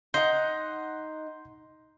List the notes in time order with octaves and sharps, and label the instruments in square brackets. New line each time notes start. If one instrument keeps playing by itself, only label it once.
[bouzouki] D#4 F#5 [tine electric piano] C6 G6